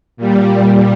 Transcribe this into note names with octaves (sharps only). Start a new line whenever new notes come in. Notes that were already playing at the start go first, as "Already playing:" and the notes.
A#2 G3